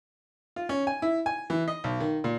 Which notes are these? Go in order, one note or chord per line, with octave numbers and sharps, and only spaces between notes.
F4
C#4
G#5
E4
G#5
E3
D#5
B1
D#3
A#2